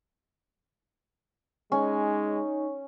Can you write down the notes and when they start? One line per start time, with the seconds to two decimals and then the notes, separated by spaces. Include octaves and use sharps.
1.72 G#3 C#4 D#4